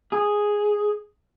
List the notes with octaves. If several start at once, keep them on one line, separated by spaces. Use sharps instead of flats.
G#4